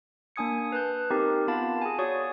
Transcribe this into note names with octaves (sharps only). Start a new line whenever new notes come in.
A#3 D4 G#5 D#6 G#6 C#7
B4 A5 F#6 G6
C4 D#4 G4 A#4
B3 F4 F5 A5 B5 A6
G#4 G#5
F#4 C#5 D5 G#5 C#6 D#6